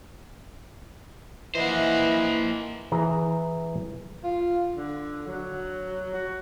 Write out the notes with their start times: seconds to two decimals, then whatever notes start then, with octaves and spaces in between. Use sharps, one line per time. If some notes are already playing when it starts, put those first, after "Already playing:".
1.55 E3 A#3 C5 D#5 F#5
2.92 E3 G#4 A#5
4.24 F4
4.76 D3
5.27 F#3
6.14 F#4